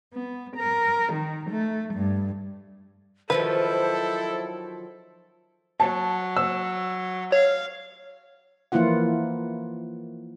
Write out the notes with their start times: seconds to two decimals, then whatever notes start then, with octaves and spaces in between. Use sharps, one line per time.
0.13 B3
0.57 A#4
1.12 D#3
1.50 A3
1.93 G2
3.30 D#3 F3 F#3 E4 A4 B4 C5
5.80 F#3 A5
6.37 E6
7.32 C#5 F5
8.72 E3 F3 A#3 E4 F4 F#5